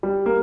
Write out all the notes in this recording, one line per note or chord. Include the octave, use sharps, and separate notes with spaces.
G3
A#3